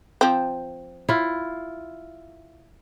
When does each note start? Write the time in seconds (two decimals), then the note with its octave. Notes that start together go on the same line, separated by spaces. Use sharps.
0.21 F3 C4
1.09 E4 F4